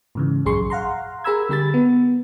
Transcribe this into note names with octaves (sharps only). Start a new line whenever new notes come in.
G#2 C#3 E3
A#1 F#2 G#4 C6 C#6
F5 F#5 A#5 C6
G#4 A#4 A#5 B5 E6 G#6
D3 G3 G4 B5 A6
B3